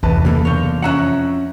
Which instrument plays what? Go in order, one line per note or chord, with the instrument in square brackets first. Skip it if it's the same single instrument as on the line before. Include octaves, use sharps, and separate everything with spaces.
[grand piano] G1 B4 A5 [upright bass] E2 C3
[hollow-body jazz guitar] C#3 A#3 A4
[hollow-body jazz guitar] B1 C#5 [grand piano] D3 A#3 G6
[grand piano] F2 A#5 F#6 [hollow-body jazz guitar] C#4 E5 F#5